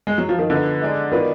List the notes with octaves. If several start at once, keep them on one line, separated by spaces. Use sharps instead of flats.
G#3
F#3
F3
D#3
D3 F3 B3 D#4
G#3 D#4 G#4 D5
D#3 F#3 B3 F4 B4 D5